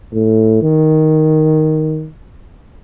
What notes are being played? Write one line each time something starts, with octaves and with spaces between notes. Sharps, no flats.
A2
D#3